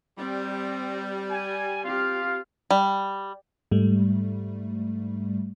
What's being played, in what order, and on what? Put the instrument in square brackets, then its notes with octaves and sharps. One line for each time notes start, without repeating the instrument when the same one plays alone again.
[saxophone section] G3 [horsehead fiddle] C4
[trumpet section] G#5
[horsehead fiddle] C4 G4 [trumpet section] F4 F5
[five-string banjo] G3
[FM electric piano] G#2 G3 A3